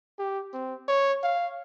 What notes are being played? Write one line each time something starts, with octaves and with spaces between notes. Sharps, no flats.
G4
C4
C#5
F5